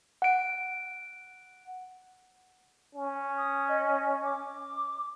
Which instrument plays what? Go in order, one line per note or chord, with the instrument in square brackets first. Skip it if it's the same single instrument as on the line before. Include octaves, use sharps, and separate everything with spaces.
[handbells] F#5 D7
[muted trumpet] C#4
[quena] D#6
D#5
D6